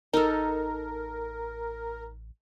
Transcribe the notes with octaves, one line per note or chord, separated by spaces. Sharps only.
A1 D#4 A4 A#4